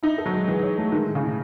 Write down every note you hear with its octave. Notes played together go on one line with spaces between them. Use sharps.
D#4 E4
A4
F#3
G#3
E3 G#4
C#5
A3
D#3 G#3
A2
C#3
A2